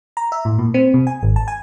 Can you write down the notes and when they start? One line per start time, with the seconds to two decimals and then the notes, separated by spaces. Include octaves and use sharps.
0.17 A#5
0.32 E5
0.45 A2
0.59 A#2
0.74 C4
0.94 C3
1.07 G#5
1.23 G#1
1.36 A5
1.48 G#5